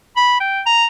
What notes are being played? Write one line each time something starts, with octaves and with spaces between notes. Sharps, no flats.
B5
G5
A#5